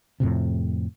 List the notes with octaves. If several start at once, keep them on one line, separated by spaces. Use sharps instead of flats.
F2 A2 C3